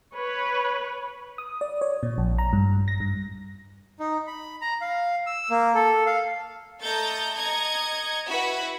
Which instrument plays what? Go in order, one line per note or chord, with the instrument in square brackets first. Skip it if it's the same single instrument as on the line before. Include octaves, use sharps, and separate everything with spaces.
[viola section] B4 C#5
[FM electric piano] D#6
D5
C#5
A#2
A#1
A#5
G2
A#6
G2
[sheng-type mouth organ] D#4
B5
A#5
F5
E6
A#3
A4
F5
[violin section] A3 A4 D#5 A#5 G6 A6
D#5 A#5 G#6 C#7
E4 F#4 B4 F#5 B5